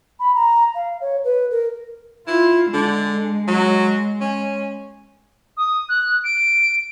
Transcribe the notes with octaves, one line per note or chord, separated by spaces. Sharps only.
B5
A#5
F5
C#5
B4
A#4
E4 F4
D3 G#3
F#3
C#4
D#6
F#6
D7